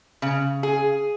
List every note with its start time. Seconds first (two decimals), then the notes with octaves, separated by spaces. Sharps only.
0.22 C#3
0.63 G#4